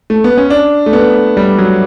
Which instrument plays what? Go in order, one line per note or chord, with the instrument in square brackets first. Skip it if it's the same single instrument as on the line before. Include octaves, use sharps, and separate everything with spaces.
[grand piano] A3
B3
C#4
D4
A3
B3
G3
F#3